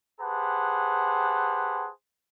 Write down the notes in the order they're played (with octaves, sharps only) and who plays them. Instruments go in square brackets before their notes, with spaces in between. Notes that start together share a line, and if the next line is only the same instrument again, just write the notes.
[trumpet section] G4 G#4 B4 C5 F#5 A5